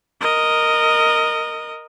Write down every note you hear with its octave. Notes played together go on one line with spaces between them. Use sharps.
A#4 D#5